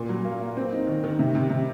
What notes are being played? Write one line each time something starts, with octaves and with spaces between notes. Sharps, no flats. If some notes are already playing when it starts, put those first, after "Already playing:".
Already playing: A#2
F#3
A#3
A#3
C4
D#4
D#3
D#3
C3
C3
C3